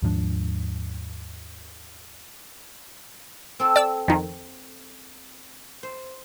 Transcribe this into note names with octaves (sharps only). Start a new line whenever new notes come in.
D#2 G#2 F3 D4
C4 A4
D5 E6
F2 D#3
C5